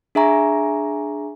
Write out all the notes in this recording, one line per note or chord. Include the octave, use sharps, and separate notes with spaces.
D4 G#4 E5 G#5 A#5 C#6